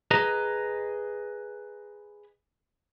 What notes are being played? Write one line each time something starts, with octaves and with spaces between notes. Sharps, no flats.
G#4 B4 D#5 A#5